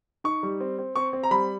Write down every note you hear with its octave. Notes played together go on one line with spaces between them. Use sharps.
D#4 C#6
G3
C4
C4
C4 C#6
C4
A#5
G3 B5